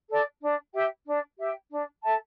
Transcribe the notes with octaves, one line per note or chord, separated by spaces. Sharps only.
A4 D5
D4
G4 E5 G5
D4
G4 E5 G5
D4
A4 E5 A5